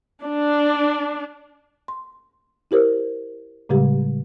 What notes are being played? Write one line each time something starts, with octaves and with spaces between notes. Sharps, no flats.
D4
C6
E4 G4 A#4 C5
A2 C#3 G3 G#3 G4